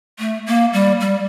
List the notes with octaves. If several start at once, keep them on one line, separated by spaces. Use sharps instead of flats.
A3
A#3
G3
G3